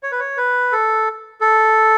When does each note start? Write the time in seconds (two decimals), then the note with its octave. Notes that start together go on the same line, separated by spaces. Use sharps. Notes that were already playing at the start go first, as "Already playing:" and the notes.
0.03 C#5
0.12 B4
0.20 C#5
0.37 B4
0.72 A4
1.41 A4